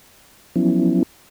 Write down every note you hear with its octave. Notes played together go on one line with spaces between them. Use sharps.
F3 F#3 B3 C#4 E4